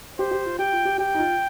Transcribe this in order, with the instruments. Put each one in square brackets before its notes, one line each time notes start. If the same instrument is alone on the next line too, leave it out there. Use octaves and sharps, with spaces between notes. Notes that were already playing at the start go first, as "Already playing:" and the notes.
[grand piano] G4 [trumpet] C5
[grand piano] G4
F4
[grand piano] G4 [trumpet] G5
[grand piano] F4
G4
[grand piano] G4 [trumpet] G5
[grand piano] D#4
F4